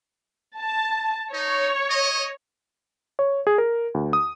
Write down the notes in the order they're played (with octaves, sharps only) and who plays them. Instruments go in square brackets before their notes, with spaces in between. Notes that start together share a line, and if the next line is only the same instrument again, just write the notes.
[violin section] A5
[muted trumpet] D#4 [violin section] C#5
[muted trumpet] D#5
[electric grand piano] C#5
G#4
A#4
D2
D#6